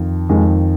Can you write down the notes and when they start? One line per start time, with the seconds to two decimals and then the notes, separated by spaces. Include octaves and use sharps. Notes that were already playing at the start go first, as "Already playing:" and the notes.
Already playing: F2 D#3
0.29 F2 D#3 G#3